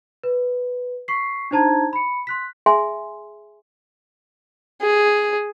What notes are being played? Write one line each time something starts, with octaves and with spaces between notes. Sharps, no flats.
B4
C#6 B6 C7
D4 D#4 C5 A5 A#5 G#6
B5 C#7
C6 F#6 B6
G#4 E5 G#5 C6
G#4